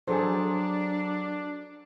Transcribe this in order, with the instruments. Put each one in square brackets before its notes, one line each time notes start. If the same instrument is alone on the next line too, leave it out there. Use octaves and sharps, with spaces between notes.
[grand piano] F#3 A4 [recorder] D4 [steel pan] G#4 C5